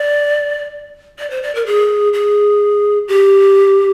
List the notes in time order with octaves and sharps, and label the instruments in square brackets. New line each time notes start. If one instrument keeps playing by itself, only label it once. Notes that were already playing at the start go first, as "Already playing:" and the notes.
Already playing: [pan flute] D5
D5
C5
D5
A#4
G#4
G#4
G4